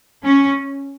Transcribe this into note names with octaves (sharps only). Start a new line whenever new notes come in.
C#4